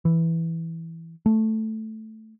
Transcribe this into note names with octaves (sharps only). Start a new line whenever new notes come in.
E3
A3